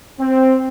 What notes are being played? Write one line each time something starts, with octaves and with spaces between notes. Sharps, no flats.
C4